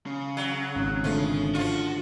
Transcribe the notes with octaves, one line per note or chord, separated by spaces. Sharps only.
C#3
F#3
G#1
D3 F3 A3
F3 F4 F#4